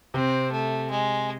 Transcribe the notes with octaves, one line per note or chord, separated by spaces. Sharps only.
C3 C4
A3
G#3